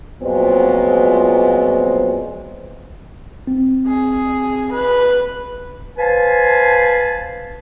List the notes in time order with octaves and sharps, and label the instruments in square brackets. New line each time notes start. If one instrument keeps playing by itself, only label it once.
[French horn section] A#2 F3 F#3 G#3 B3 C4
[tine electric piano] C4
[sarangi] G#4
B4
[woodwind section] B4 C5 F5 G#5 A5